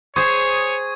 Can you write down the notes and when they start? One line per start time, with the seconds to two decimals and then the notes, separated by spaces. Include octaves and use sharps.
0.16 G#4 C5 C#5 C#6 D#6 G#6